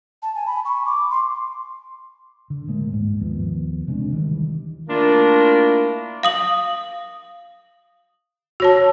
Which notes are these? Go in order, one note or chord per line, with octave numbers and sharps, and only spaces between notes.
A5
G#5
B5
C#6
D6
C6
D3
A2 G#3 A#3
D#1 G#2
D#2 F3 B3
C3 G#3 C#4 D4
D#3 E3 G3
A3 A#3 D4 E4 F4 A#4
F5 D#6 F#7
F#4 C#5 A5